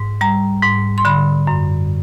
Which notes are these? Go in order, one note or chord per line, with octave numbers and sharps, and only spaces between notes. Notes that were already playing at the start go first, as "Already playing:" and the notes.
Already playing: G#2
G3 A#5
G#2
C6
D3 B5
F#2